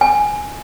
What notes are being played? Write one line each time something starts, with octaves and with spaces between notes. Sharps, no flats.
G#5